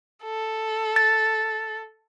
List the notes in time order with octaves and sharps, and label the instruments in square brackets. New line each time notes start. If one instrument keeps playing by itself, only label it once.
[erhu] A4
[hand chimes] A6